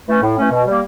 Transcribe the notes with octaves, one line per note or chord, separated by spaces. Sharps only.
E3 A3 C#4
A2
E3 A3 C#4
B2
G3 A#3